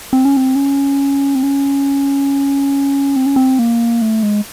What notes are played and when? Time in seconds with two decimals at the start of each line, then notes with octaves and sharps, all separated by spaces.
0.13 C4
0.25 C#4
0.37 C4
0.55 C#4
1.35 C4
1.43 C#4
3.16 C4
3.26 C#4
3.36 C4
3.59 A#3
4.02 A3
4.23 G#3